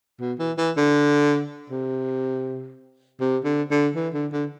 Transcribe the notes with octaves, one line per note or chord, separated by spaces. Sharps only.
B2
E3
E3
D3
C3
C3
D3
D3
E3
D3
D3